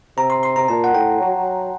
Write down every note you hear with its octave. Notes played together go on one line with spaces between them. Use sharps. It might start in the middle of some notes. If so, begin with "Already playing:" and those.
C3 A#5
C6
C6
C3 A#5
A#2 A5
F#5
A2 G5
F#3
F#3